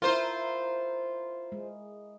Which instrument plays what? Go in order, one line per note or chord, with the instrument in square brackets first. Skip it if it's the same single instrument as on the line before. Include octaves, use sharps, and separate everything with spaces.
[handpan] E4 A#4 [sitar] F4 C5
[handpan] G#3